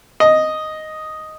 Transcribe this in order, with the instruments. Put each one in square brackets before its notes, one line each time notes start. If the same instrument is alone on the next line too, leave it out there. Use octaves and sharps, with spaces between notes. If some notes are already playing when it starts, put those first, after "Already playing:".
[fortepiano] D#5